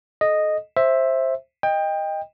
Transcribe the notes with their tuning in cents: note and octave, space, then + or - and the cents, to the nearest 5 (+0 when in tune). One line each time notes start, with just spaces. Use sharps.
A4 -35 D#5 -5
C5 +15 E5 +0
D#5 +0 G5 +20